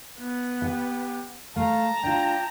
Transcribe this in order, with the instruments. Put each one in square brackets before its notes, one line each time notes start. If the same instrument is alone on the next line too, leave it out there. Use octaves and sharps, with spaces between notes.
[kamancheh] B3
[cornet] G4 [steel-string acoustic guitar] F#5
[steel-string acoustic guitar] A3 [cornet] F5 [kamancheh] A5 A#5
[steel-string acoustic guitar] D4 F4 [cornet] G5